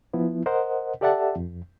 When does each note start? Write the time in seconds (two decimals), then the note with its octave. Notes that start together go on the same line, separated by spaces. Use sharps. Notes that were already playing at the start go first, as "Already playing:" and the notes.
0.13 F3 B3 E4
0.46 A#4 C5 D#5 F#5
1.01 G4 A4 D5 E5 F#5 A5
1.36 F2